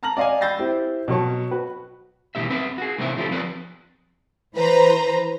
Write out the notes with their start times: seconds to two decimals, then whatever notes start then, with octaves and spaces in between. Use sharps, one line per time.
0.03 A5 A#5 F6 A#6 F#7
0.17 D5 D#5 F5 F#5 G#5
0.41 B5 E6 G6 A6 A#6 C7
0.59 C4 E4 G4
1.08 B2 F#3 C#5 A5
1.51 F#4 B4
2.35 B2 E3 F3 C4 G4 E5
2.50 C4 B4 E5
2.78 F#4 G#4
2.98 A2 C3 E3 C4 D5 E5
3.16 D3 F3 D#4 F4 G4 A4
3.29 F3 C4 B4 D5
4.55 E3 B4 C5 A#5